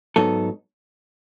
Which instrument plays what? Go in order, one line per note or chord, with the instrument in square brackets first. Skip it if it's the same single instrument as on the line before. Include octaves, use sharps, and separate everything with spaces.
[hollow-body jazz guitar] G#2 F#3 B3 D#4 A4